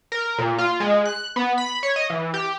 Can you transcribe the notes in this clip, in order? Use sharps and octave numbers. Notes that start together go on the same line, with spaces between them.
A#4
A#2
F4
G#3
F#6
B3
B5
C#5
D#5
E3
G4